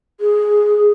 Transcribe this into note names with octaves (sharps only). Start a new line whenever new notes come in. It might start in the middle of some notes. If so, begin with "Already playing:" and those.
G#4